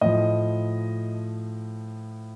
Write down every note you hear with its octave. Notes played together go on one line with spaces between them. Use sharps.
A2 F3 D#5